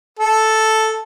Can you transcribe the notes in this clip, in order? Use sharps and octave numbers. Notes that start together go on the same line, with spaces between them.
A4